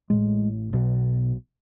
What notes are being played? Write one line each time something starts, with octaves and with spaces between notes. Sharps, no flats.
A1 A2 G#3
B1 B2